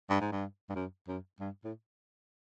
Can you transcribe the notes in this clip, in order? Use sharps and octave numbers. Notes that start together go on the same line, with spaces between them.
G2
G#2
G2
G2
F#2
F#2
G2
A2